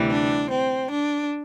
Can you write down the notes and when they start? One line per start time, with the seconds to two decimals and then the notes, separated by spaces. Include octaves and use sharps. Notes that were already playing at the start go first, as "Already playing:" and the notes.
Already playing: D2 C3 E3 G3
0.10 D4
0.50 C4
0.90 D4